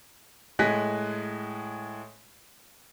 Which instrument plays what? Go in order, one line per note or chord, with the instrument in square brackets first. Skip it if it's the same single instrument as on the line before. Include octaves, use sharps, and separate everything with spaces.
[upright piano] A2 G#3 G#5 F#6 A#6 B6